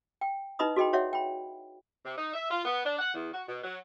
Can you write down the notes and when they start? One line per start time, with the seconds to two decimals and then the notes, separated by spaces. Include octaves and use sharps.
0.21 G5
0.59 D#4 E4 B4 D#5 B5 D#6
0.76 F#4 G#4 D#5 G5 B5
0.93 F#4 C#5 D5 E5 F#5
1.13 G5 B5
2.05 C3
2.17 D#4
2.34 E5
2.51 F4
2.65 B3
2.85 D4
2.99 F#5
3.14 E2
3.33 F#4
3.48 B2
3.64 F#3